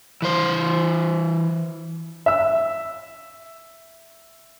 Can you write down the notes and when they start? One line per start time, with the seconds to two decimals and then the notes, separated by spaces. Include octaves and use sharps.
0.22 E3 C5
2.26 E5 E6